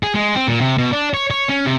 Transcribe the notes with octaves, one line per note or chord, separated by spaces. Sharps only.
G#4
G#3
C4
A#2
C3
B2
D4
C#5
C#5
C#4
C3